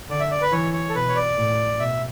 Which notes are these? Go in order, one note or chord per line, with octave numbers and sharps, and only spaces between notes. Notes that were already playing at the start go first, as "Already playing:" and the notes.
D3 D5
E5
D5
B4
E3 C#5
C#5
A4
B2 B4
C#5
D5
A2
B2 E5